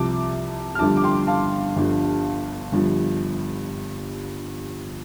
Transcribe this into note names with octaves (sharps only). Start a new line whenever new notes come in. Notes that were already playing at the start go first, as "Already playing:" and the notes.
Already playing: C2 C3 F3 A5 D6
F6
G1 G2 D3 F3 A5 D6
D6
G5 C6
F5 A5
G1 G2 D3 F3
G1 G2 F3